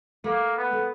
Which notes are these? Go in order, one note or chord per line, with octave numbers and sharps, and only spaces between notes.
A3 A#3
B3
A3